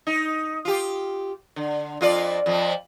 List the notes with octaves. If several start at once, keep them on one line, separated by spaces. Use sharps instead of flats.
D#4
F4 G4
D3
F2 F4 D5
F2 F3